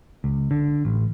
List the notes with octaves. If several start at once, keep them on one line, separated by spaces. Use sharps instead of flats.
C#2
D3
A1